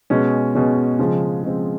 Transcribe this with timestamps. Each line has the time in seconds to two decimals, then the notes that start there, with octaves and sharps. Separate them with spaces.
0.10 B2 G#3 C#4
0.54 B2 G#3 C#4
0.99 C#3 F3 G#3 C4
1.43 C#3 F3 G#3 C4